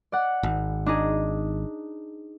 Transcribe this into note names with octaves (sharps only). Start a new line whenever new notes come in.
D5 F#5
G#1
D4 D#4 G#4